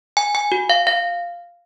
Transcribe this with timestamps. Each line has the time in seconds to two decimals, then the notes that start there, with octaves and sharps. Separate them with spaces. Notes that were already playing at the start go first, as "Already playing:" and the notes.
0.17 G#5
0.35 G#5
0.52 F#4
0.70 F5
0.87 F5